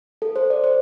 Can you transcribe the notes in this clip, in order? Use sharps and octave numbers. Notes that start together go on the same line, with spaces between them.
A4
C5
D5
C5